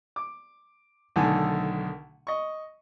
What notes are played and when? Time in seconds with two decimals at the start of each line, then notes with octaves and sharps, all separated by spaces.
0.16 D6
1.16 B1 D3 D#3 A3 G#5
2.27 D#5 C#6